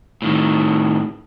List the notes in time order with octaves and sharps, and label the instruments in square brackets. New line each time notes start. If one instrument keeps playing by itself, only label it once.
[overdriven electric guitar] A2 D#3